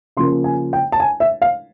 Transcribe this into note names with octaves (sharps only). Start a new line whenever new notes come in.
C#3 F3 A#3 C6
G#5
G5
A5
G#5
E5
F5